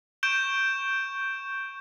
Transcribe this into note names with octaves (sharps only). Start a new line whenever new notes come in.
C#6 G6 D7 E7 G7